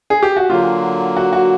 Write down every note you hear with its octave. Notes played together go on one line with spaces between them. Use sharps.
G#4
G4
F#4
D3 F#3 A#3 F4
F#4
F#4